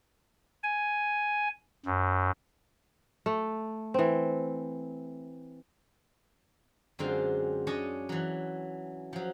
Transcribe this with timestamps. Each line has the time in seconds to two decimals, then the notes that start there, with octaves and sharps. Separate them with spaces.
0.63 G#5
1.85 F#2
3.26 A3
3.94 E3 C4
6.99 F#2 D3 G#3 C4 F4
7.67 C#4 D4 C#5 D#5 G#5 A5
8.09 E3 F#3
9.13 F3 F#3